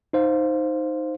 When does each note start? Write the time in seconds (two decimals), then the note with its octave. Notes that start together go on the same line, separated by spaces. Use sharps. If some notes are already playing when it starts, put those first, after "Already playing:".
0.13 D#4 C5 F5